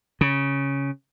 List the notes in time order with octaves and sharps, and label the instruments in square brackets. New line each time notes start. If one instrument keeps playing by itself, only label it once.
[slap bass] C#3